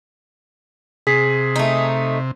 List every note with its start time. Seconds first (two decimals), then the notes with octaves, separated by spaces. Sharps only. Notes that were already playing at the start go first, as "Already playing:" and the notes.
1.07 C3 G#4 B6 C7
1.56 A3 D#4